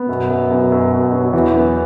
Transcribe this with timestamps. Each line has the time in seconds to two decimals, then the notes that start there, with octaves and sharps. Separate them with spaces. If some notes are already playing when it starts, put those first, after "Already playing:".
Already playing: B3
0.09 F#2 B2
0.30 F#2
0.50 F#2
0.72 F#2
0.92 F#2
1.13 F#3
1.33 E2 E3
1.54 B3